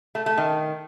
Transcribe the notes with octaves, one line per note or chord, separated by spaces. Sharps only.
A3
A3
D#3